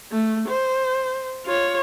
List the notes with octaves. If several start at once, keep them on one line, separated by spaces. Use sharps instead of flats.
A3
C5
F4 C#5